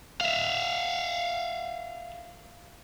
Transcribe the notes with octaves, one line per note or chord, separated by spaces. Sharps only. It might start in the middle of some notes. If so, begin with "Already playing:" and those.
E5 F5